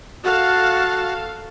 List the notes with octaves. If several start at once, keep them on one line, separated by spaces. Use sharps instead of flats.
F#4 A4 F5 A5